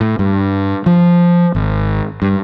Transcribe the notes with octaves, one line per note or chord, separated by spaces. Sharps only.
A2
G2
F3
G#1
G2